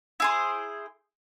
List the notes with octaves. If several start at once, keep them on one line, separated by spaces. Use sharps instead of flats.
E4 G#4 C5